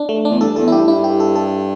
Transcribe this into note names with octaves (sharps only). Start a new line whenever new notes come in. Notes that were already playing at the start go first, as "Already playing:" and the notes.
Already playing: D4
A3
D4
E2
G2 A4
E2 A4
E4
G2 G4
G2 E4
G4
A4
A4